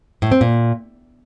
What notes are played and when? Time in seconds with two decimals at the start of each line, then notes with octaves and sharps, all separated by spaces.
0.22 A2
0.32 C4
0.41 A#2